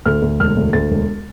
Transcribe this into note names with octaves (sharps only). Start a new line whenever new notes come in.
D2 F6
D2
E1 F6
D2
D2 A6
E1